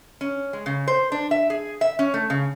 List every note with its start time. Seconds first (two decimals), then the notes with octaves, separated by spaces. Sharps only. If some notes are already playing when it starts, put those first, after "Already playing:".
0.21 C#4
0.53 G#3
0.66 C#3
0.88 C5
1.12 D4
1.31 E5
1.50 G#4
1.81 E5
1.99 C#4
2.14 A3
2.30 C#3